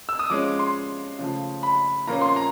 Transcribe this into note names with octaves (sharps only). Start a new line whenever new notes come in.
E6
D#6
F3 G#3 C#4 D6
D6
C6
C#3 F3 A3
B5
A#2 F3 A#3 C#4 A#5
C6
A#5